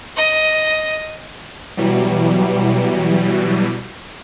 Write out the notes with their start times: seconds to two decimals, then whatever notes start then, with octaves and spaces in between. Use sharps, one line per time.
0.16 D#5
1.77 B2 E3 F#3 G3